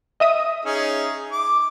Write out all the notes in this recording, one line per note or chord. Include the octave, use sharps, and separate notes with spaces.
D#5 E5 D#6
C#4 D#4 G#4
D6